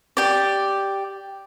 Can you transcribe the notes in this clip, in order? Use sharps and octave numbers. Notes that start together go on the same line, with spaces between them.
G4 D5